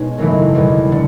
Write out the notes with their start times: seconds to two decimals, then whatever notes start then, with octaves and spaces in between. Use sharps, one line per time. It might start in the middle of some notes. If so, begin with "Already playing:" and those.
Already playing: B2 G#3 C#4 D#4
0.18 G#1 F#2 C#3 E3 A3
0.55 E2 B2 G3
0.92 D3